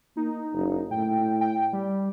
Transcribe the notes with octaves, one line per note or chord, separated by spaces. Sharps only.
A#3 D#4
F#1
A2 G5
G5
G3